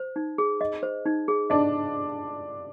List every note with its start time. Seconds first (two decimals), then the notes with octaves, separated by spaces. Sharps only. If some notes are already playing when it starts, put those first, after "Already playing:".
Already playing: C5
0.16 D#4
0.38 G#4
0.61 D#5
0.83 C5
1.06 D#4
1.28 G#4
1.50 D4 D#5